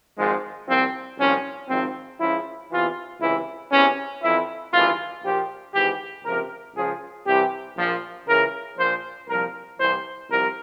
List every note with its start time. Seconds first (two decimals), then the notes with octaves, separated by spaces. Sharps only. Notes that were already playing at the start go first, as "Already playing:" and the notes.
0.17 G#1 G#2 F3 G#3
0.67 C2 A#2 F3 C4
1.18 C2 A#2 F3 C#4
1.68 G#1 G#2 F3 C4
2.19 C#2 C#3 F3 E4
2.70 E2 C3 E3 F4
3.21 C#2 C3 E3 E4
3.72 E2 C3 E3 C#4
4.22 F2 E3 E4
4.72 G#1 G2 E3 F4
5.23 A#1 A#2 F3 G4
5.74 G#1 G#2 E3 G4
6.24 C#2 C3 F3 A#4
6.75 C#2 C#3 F3 G#4
7.26 C2 C3 E3 G4
7.76 A#1 A#2 F3
8.28 C#2 C#3 E3 A#4
8.77 A#1 A#2 F3 C5
9.28 C2 A#2 F3 A#4
9.78 C2 C3 E3 C5
10.29 C2 C3 F3 A#4